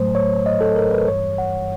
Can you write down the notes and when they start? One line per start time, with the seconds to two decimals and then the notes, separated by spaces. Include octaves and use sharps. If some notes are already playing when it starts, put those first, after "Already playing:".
Already playing: A2 F#3 A3 C5
0.15 C#5
0.46 D#5
0.61 A4
0.76 A#4
0.92 B4
1.07 G2 E3 G3 C#5
1.38 F#5